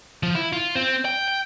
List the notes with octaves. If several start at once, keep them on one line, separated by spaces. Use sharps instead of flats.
F3
E4
F4
C4
G5
G5